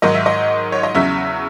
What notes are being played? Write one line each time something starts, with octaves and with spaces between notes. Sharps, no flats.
G#2 D#3 F#3 D#5
E5
D#5
C#5
D#5
E2 C#3 F#3 E5